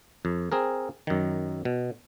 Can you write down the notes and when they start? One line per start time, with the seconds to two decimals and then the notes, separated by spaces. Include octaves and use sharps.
0.25 F2
0.52 C4 G#4 A#4
1.07 F#2 D#3
1.65 B2